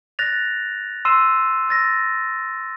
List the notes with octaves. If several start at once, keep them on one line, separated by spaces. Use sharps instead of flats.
F#6 A6 A#6 F7
C6 E6 C7 D#7 E7
E6 A6 A#6